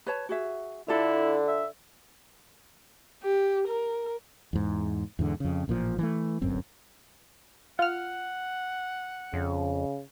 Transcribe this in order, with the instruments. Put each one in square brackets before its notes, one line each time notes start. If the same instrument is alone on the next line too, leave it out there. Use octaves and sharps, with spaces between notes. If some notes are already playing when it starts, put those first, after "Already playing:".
[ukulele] B4 C#5 A5
F#4 G#4 E5
[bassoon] D3 [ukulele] D4 F4 A4 [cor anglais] E4
[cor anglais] E5
[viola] G4
A#4
[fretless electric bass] E2 G#2
E2 G#2 D3
F2 C#3
A1 A#2 D#3 F3
E3 G#3 A3
D1 G1 F#2 C4
[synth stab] F4 F6 [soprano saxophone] F#5
[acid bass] F2 [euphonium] C#3